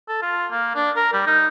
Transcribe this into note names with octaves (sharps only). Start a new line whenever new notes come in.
A4
F4
A#3
D4
A#4
G3
D#4